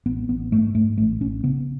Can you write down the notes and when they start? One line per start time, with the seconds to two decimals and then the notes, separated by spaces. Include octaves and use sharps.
0.06 A1 B3
0.29 A1 B3
0.51 G#2 A3
0.75 G#2 A3
0.98 A1 A3
1.21 A1 C#4
1.44 C#3 B3